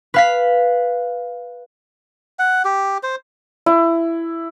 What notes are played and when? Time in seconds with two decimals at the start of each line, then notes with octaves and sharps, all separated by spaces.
0.14 B4 F5 B6
2.39 F#5
2.65 G4
3.03 C5
3.66 E4